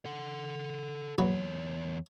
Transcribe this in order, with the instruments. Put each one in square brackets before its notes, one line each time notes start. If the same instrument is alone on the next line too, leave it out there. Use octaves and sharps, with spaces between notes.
[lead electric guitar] A4 F#5
[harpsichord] A#1 F#3 B4 [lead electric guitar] E2 C#5